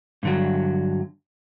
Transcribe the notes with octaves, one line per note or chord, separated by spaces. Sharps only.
G2 D3 F#3